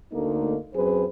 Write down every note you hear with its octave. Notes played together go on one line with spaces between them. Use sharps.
D2 D3 A3 A#3 D#4
F#2 F#3 C4 G#4 B4 C5